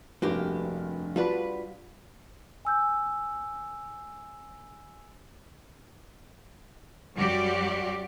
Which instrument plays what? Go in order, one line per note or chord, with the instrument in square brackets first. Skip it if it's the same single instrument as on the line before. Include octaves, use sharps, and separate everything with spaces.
[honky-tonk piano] F1 G2 [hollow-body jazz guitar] A#3 F#4 G4
[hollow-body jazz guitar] G3 D4 B4 [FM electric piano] F4 F#4 B5
[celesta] G#5 E6 G6
[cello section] F#2 G3 F#4 G4 D5